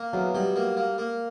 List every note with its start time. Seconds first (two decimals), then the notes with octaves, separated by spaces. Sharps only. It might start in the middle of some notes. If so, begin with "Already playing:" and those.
Already playing: A#3
0.13 E2 F#3
0.34 F#3 G3
0.56 A#3
0.77 A#3
0.98 A#3